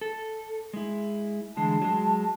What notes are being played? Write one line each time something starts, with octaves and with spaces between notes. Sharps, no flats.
A4
G#3 E4
D3 E3 G#3 A5
F#3 G#3